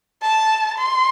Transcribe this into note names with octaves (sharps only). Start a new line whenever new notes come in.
A5
C6